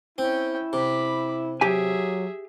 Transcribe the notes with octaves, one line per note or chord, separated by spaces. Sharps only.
C4 C#4 E4 G5
C3 B5 D6
F#3 G4 G#4 E5 G#5